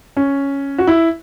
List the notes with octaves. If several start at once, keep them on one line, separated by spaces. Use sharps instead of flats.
C#4
F#4
E4